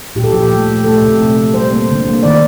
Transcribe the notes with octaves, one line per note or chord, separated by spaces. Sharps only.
A#2 G4
A4
F3 G4
A3
A3
A3 A4
C3
A3
A3
G3 C5
A#3
D3
A#3
D#3 D5